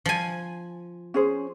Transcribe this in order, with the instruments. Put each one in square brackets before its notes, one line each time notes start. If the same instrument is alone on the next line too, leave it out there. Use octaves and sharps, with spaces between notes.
[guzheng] F3 G#5
[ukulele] C#4 G#4 C5